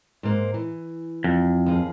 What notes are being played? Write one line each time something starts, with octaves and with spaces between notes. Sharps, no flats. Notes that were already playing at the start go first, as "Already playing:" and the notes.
G#2 A#3 C5
E3
F2
D#2 F3 G#4